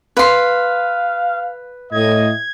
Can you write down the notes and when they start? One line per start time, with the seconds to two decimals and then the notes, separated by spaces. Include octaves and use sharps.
0.17 B4 F5 C6
1.92 A2 D#5 G#6